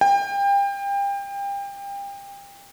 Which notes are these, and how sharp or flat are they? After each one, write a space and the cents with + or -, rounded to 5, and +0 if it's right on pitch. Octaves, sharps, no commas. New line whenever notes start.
G5 +30